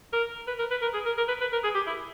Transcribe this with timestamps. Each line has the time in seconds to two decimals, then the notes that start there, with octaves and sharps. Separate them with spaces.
0.13 A#4
0.47 B4
0.59 A#4
0.71 B4
0.82 A#4
0.94 G#4
1.06 A#4
1.18 A#4
1.28 B4
1.41 B4
1.52 A#4
1.64 G#4
1.75 G4
1.87 E4